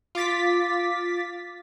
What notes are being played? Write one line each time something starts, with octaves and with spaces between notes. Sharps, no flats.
F4 D6 A6 B6